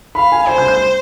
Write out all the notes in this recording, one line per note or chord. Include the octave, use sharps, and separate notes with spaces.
F5 B5
G#5
C5 G#5
G6
G6